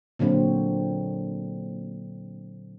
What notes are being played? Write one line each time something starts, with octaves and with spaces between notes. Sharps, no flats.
A#2 D3 F#3 C4